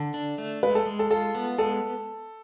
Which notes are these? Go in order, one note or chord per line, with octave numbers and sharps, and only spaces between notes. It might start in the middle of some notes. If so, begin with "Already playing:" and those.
Already playing: D3 A4
D4
A3
G#3 B4
A4
G#3
A4
F4 A4
B3
G#3 A4